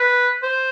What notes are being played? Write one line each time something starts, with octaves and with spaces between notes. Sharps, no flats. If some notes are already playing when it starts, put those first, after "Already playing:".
Already playing: B4
C5